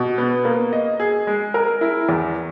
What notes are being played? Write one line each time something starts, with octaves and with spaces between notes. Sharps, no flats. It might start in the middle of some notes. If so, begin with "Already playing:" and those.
Already playing: B2
B3
A#3
D#5
G#4
G#3
A#4
E4
E2